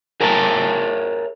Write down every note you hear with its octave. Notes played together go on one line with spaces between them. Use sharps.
G#4 A#4 C#5 E5 G#5 A5